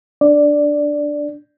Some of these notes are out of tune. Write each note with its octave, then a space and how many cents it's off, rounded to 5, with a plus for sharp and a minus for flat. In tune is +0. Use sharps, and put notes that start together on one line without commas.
D4 +0 D5 +0